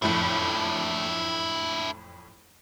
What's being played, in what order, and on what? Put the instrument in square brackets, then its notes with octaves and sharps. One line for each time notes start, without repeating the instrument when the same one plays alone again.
[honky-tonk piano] F#1 F2 A2 [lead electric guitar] D4 E4